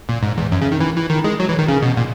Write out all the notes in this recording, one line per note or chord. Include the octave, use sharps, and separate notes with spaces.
A#2
G#2
E2
F#2
C#3
D#3
E3
E3
D#3
G#3
F#3
E3
D#3
C#3
B2
A#2